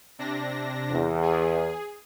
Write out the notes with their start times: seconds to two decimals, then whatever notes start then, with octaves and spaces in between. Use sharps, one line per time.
0.19 C3 D4 A#6
0.91 E2
1.22 G#4